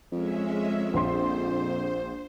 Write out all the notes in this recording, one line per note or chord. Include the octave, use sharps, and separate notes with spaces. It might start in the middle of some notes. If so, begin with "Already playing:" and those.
F2 G#3 C#4 E5
A#1 C5 C6